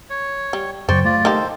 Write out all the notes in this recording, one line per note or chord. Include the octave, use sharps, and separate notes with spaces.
C#5
G3
F#2 C#3 F#3 C5 D5 G5 C#6
A3 F4 D5
D#3 A#3 G4 A4 C5